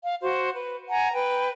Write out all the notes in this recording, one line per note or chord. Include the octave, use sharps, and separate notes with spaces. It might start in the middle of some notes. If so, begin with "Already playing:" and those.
F5
F#4 C5
B4
F#5 G#5 A#5
B4 G5